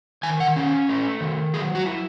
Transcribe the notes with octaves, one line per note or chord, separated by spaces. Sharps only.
D#3 G#5
F#5
C#4
A3
D#3
F#3 G#4
F#4
E4